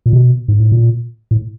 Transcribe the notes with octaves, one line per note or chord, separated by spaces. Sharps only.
A#2
B2
G#2
A2
A#2
A2